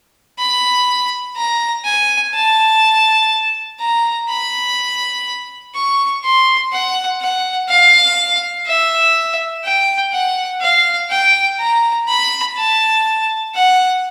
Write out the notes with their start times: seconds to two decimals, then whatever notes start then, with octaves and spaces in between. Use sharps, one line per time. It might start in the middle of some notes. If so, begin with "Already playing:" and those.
0.39 B5
1.36 A#5
1.85 G#5
2.33 A5
3.80 A#5
4.29 B5
5.75 C#6
6.24 C6
6.72 F#5
7.21 F#5
7.69 F5
8.67 E5
9.65 G5
10.13 F#5
10.62 F5
11.10 G5
11.59 A#5
12.08 B5
12.57 A5
13.55 F#5